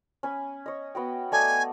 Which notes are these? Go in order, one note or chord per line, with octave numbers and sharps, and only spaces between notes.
C#4 G#5 B5
C#5 D#5
B3 F#4 G5
A3 D5 D#5 G#5